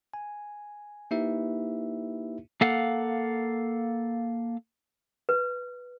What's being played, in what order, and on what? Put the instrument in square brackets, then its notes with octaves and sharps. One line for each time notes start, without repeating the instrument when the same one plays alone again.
[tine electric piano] G#5
A#3 D#4 E4 G4 B4 E5
[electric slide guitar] A#3 A4 F5 F#5
[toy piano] B4